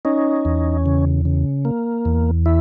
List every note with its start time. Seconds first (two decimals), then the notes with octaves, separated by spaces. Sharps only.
0.05 C#4 D#4
0.45 E2
0.86 C#3
1.25 C#3
1.65 A#3
2.05 E2
2.46 E4